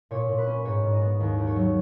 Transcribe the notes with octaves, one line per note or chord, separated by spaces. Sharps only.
A#2 C#5
A#2
B4
C#4
B4
G#2 C#5
G#2
D#4 D#5
B3
D#2
D#2
C#5
F#3